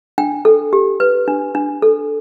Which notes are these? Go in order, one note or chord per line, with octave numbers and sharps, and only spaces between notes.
D4 G5
A4
G4
B4
D4
D4
A4